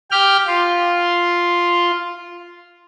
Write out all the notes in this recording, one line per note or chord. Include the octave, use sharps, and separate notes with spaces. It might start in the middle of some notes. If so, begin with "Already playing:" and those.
G4 G5 F6
F4